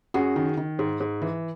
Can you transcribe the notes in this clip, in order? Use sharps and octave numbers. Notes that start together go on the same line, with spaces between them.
F#2 F#4 G#4
D#3
D#3
G#2
G#2
E3